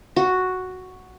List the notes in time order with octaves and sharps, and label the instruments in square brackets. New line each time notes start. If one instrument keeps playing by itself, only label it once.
[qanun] F#4